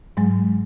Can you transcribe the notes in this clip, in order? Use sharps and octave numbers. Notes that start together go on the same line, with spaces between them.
G#2 F#3 G#3